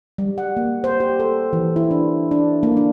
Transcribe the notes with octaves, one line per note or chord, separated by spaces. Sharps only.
G3
F#5
A#3
C5
G4
A4
E3
E4
D4
D4
A#3
D4